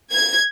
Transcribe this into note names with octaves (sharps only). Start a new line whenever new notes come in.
G#6